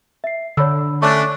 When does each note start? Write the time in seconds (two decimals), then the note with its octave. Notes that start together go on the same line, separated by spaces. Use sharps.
0.24 E5 C7
0.57 D3 C#5 B5 E6
1.02 A3 C#4 D4 C#6 D6 F#6